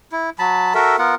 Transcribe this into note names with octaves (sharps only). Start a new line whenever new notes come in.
E4
F#3 A5 B5
F#4 A4 A#4 E5
B3 F4 A#4 F#5